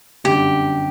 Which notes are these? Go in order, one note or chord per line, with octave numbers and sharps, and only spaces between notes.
G1 F#2 D3 G3 G4